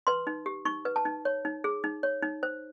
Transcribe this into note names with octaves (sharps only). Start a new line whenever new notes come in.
B4 C6
D#4
G4
D#4 C#6
B4
A5
D#4
C#5
D#4
G#4
D#4
C#5
D#4
C5